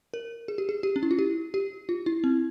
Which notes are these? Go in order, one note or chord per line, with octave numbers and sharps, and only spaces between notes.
A#4
G#4
G4
G#4
G4
C#4
E4
F4
G4
G4
F4
E4
C4